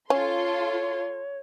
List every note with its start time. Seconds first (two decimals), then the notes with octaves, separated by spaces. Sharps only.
0.10 C#4 F4 A4 C#5 C6